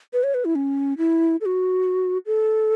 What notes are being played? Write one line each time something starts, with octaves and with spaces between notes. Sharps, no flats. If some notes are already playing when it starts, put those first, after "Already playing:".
B4
C#5
B4
E4
C#4
E4
A4
F#4
A4